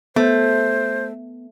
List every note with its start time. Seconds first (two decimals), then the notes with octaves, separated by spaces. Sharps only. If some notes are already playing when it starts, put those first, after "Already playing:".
0.16 A3 B3 C5